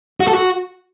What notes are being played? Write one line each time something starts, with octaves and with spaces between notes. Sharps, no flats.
F#4
A4
F#4